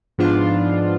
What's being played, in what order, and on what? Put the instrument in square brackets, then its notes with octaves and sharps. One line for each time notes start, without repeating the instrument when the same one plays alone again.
[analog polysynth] G#2 F3 B3 D4 F4